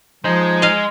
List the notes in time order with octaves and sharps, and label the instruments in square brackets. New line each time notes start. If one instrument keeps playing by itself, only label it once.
[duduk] F3 [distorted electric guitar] G#3 [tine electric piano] D#4 C5
[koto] D#5 F5